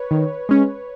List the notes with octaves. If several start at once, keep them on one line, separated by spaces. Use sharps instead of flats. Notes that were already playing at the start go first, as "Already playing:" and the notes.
Already playing: B4 C#5
D#3
G#3 C#4